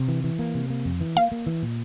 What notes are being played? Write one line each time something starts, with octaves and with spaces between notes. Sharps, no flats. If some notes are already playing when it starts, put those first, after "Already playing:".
Already playing: C3
E3
E3
A#3
C3
A#3
F2
E3
A#3 F5
A#3
E3
A#2